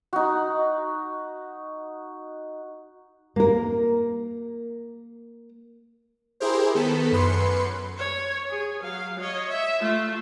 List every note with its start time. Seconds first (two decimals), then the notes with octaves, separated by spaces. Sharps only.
0.13 D#4 F#4
3.36 A#3 A#4
6.40 E4 G4 G#4 A#4 C5
6.74 D#3 B3 A4 B6
7.12 F#2 B4 C6 C#7
7.97 C#5
8.50 G#4
8.83 F#3 F5
9.20 C#5 D#5
9.50 E5
9.81 A3 F4